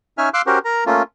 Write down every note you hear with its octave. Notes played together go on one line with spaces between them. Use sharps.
C#4 D#4 C#5 E5 G#5 F6
F5 C6 D6 E6 F#6
C#4 F#4 G4 A#4 C5
A#4 A#5
A3 A#3 C#4 F4